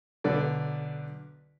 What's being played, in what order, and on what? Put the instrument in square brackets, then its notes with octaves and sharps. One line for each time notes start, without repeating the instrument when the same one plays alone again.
[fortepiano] B1 D3 B4 D5